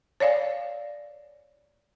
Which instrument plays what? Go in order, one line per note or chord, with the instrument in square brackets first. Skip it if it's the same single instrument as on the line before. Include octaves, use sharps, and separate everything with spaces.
[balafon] C#5 D5 F5 G#5